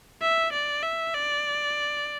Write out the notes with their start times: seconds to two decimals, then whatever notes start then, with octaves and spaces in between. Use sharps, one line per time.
0.22 E5
0.53 D5
0.83 E5
1.14 D5